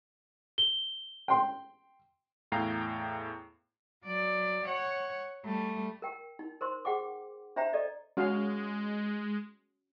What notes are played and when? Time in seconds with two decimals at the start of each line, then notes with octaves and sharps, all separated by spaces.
0.58 G7
1.28 G5 C6
2.52 E2 A2 F5 G5 A#5 C7
4.06 F#3 D5
4.67 C#5 F#5
5.45 G3 A3
6.02 A#4 G5
6.39 D#4
6.61 A#4 C5 C6
6.85 G#4 F#5 G5 D6
7.56 D4 C5 E5 G5 A#5
7.73 A4 D5 D#5
8.17 G#3 C#4 F#4 F5